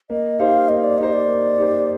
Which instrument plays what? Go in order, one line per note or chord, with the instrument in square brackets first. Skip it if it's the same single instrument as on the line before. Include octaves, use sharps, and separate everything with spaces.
[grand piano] A#3 [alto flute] D#5
[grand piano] D#4 G4 C5 [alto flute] F5
[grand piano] A#3 [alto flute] D#5
[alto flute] D5
[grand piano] D#4 G4 C5 [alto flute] D#5
[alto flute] D5
[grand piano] A#3
D#4 G4 C5